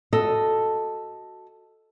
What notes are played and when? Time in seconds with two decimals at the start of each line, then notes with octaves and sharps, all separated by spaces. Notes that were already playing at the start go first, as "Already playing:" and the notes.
0.13 F#4 A4 D#5